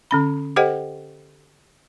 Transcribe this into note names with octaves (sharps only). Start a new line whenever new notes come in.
D3 C#4 B5
G4 A4 C5 D#5 F#5 G5